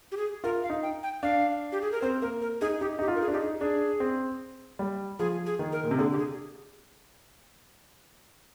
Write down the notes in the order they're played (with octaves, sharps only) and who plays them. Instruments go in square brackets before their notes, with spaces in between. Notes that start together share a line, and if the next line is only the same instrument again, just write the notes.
[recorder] G4
G#4
[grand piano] F4 [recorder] A#4
[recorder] F5
[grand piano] D#4
[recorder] G5
G5
[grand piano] D4 [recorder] F5
[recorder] G4
G#4
A#4
[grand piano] C4 [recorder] C5
[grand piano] A#3 [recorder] A#4
[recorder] A#4
[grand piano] D#4 [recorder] G#4
[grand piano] D#4 [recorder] G4
[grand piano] D#4 [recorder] G4
[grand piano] F4
[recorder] A#4
G#4
[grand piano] D4
[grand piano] D#4 [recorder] G4
[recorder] G#4
[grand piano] D4 [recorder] G#4
[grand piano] C4
G3
[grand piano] F3 [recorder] G#4
[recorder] G#4
[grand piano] D#3
[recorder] A#4
[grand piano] A#2
C3
[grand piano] D3 [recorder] G#4
[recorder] G4
G#4